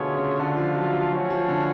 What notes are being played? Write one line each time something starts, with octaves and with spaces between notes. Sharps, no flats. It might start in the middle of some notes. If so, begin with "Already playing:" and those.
Already playing: B2 D3 A3 F4 G#4 C#5
C#3
D3 A3 D4 F4
F3
F#3
F#3
F3 A3 C#4 F#4 C#5 F5
F3
D3